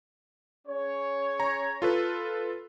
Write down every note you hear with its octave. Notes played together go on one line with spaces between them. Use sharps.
C#4 G#4 C#5
A#5
F4 A4 B4